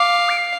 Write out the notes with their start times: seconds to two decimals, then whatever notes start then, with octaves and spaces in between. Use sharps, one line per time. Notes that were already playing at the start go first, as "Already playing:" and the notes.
Already playing: F5 D6
0.29 D7
0.38 C7